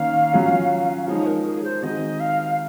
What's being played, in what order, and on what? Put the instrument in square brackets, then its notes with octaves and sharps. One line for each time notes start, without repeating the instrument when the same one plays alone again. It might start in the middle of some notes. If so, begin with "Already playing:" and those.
Already playing: [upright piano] D#3 A#3 C#4 [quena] F5
[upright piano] F#3 C#4 F4
[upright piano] F3 G#3 D#4 [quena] C#5
[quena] A#4
G#4
C5
[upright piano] D#3 G#3 C4 F#4 [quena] D#5
[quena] F5